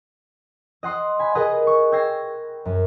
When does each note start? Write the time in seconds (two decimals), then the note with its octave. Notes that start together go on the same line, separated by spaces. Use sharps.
0.83 D#5 F#5 C6 D#6
1.19 G#5 B5
1.35 G#4 A#4 B4 D#5 F#5 A#5
1.67 C#6
1.92 G5 E6 G#6 A#6 C7
2.65 F#2